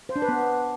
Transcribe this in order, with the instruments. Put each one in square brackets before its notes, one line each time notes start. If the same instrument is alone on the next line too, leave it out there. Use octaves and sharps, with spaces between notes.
[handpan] C5
D4
B4
B3